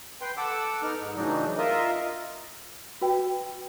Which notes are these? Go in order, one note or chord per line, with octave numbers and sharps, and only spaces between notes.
B4 G5 C6
A4 F#5 D6 E6
B3 D#4 F6
G#2
A2 C#3 E3 F#3 D4 D#4
F4 A#4 D#5 E5
F#4 B4 G5